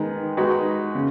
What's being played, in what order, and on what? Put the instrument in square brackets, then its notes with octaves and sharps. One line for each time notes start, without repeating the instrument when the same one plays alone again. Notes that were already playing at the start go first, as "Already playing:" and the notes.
Already playing: [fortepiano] D#3 G#3 B3 D#4 B4
G#3 D#4 F#4 B4
C#3